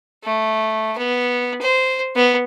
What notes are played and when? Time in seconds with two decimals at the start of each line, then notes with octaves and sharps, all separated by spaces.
0.24 A3
0.97 B3
1.61 C5
2.16 B3